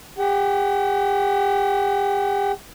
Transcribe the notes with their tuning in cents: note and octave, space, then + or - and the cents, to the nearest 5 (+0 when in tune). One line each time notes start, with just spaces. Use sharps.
G4 +40 F#5 +45